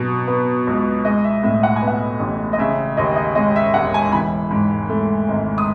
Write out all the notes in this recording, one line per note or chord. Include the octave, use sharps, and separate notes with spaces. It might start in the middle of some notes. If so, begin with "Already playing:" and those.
Already playing: B2 F#3
B3
C#2
G#3 D#5
E5
A2 E5
F#5
G#5
B3
F#5
A1
D#5
C#3 E5
D#2 D#5
D#5
G#3 D#5
E5
E1 F#5
G#5
E3 B5
G#2
A3
G#1
D#6